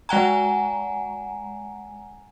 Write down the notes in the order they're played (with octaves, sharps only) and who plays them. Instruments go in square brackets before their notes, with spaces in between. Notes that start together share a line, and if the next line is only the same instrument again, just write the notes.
[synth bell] G#3 F#5 G#5 A#5